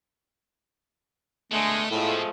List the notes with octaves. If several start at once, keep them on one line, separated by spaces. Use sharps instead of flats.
B2 D3 G#3 A3
A2 F3 G#3 A3